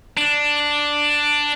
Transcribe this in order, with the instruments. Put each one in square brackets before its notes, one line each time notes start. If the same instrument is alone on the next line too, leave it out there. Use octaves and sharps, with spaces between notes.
[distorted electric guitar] D4